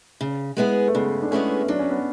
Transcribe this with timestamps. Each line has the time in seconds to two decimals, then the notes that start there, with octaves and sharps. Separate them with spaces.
0.21 C#3
0.57 G#3 B3 E4 G#4
0.88 A3
0.95 C#3 G#3 B3
1.22 D4
1.31 G#3 A3 B3 C#4 E4 G#4
1.68 F#3 D4
1.79 C#4
1.90 B3